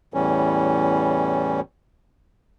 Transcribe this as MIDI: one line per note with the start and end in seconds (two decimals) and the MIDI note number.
0.14 1.60 40
0.14 1.60 45
0.14 1.60 52
0.14 1.60 55
0.14 1.60 61